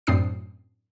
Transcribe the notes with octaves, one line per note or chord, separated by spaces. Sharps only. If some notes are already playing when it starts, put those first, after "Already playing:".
F#2 A2 C4 D4 D#6 C7